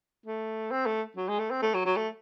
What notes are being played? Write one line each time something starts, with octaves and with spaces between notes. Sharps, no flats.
A3
C4
A3
F#3
G#3
A3
C4
A3
F#3
F#3
A3